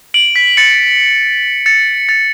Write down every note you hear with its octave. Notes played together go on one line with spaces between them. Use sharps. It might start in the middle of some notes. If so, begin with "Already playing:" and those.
D7 F#7
B6
A6 C#7
A6 C#7
A6